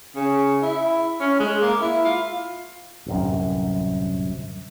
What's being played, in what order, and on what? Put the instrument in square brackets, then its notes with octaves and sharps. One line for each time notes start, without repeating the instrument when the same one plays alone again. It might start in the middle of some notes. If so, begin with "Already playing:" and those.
[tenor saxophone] C#3
E4
C#4
G#3
A#3
E4
F4
[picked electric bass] D1 C2 F#2